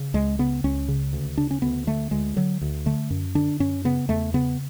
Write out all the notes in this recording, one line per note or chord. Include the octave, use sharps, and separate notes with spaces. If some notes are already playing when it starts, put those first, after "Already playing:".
Already playing: C#3
C#2 G#3
C#3 B3
C#2 C#4
C#3
D2
C#3 D4
C#4
D2 B3
D3 A3
D2 G#3
D3 F#3
D2
D3 A3
F#2
D3 D4
F#2 C#4
C#3 B3
E2 A3
C#3 B3